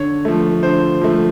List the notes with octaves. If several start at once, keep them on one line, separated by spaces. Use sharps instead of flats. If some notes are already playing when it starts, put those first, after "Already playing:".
Already playing: D3 C#5
F3 A3
D3 C5
F3 A3